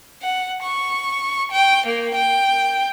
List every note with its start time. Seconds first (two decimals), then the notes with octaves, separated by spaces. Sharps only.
0.23 F#5
0.63 C#6
1.52 G5
1.86 A#3
2.15 G5